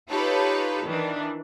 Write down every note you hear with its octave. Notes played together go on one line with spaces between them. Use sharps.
D#4 F4 G4 A4 B4 C#5
D#3 E3 D4